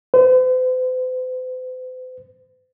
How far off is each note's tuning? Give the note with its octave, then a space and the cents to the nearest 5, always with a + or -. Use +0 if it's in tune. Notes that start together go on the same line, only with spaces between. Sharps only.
C5 -45